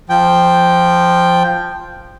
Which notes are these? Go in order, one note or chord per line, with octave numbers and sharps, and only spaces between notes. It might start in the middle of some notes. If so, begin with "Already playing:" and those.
F3 G5